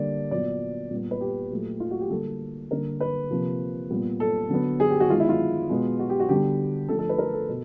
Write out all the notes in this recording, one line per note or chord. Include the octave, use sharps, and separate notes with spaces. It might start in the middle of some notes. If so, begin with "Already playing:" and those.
Already playing: D3 G3 A#3 D5
A#2 F#3 B3 D5
A#2 G3 B3
B4
G4
A#2 F#3 A3
F4
F#4
G4
D3 G3 A#3 A4
D3 G3 A#3 A#4
B4
C3 F3 A#3
A#2 G3 B3
A4
D3 F#3 B3
G#4
G4
F#4
D#3 G#3 B3 F4
E4
F4
B2 G#3 B3
F#4
G4
F#4
D3 G3 B3 G4
D3 F3 A3 A4
A4
B4
A#4
A4
B2